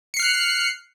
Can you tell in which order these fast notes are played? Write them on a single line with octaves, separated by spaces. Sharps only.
C#7 C7 F6 F#6